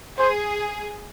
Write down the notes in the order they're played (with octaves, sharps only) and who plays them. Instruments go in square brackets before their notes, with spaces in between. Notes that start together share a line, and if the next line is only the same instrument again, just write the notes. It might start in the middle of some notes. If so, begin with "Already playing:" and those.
[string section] G#4 [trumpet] C5